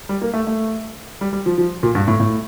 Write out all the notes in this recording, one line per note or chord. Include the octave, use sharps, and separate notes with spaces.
G3
A#3
A3
A3
G3
G3
F3
F3
A#2
G2
A2
A2